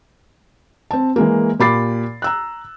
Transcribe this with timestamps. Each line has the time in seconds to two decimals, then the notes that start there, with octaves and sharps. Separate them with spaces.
0.91 C4 A5
1.16 E3 G#3 A#3
1.60 A#2 G4 B5 D6 A6 C7
2.22 A#5 E6 F#6